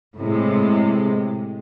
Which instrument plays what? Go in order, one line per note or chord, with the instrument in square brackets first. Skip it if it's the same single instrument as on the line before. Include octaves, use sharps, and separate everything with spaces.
[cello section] A2 C3 G#3